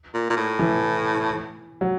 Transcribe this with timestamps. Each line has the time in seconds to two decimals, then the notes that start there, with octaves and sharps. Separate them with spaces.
0.14 A#2
0.30 A#2
0.37 A2
0.59 E3
1.81 F#3